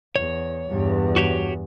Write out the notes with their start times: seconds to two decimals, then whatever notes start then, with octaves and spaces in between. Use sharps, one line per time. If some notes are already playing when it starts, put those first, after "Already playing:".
0.16 E2 C#5
0.70 E2 G2
1.16 F#4 G4 C#5